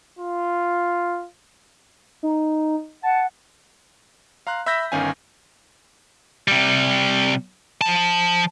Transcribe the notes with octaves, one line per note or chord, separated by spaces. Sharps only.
F4
D#4
F#5 A5
F5 A#5 C6 F#6
E5 B5 E6 G6 A#6 B6
G1 D#3 C#4 F5 G#5
C3 G3
F3 A5